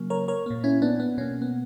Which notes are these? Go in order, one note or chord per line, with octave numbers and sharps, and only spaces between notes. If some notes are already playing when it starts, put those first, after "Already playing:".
Already playing: C#3 F#3 A#3
A#4 C#5
A#4 C#5
A#2 A#3
C#4 E4
B3 D4
B3
B2 A#3 C#4
B3